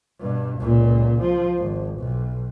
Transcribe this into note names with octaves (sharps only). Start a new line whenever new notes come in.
G2 B2
C#2 A#2
F3
G#1
B1